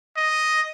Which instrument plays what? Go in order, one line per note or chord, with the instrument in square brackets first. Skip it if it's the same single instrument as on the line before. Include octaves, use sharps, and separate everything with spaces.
[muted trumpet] D#5